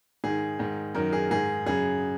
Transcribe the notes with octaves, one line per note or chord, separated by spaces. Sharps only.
G#2 D#3 G#4
G#2 D#3
F#2 D#3 A#4
G#4
G#2 D#3 G#4
F#2 C#3 G#4